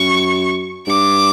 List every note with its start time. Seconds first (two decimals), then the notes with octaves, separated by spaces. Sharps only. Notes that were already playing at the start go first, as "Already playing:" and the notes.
Already playing: F#2 C#6
0.87 G2 D6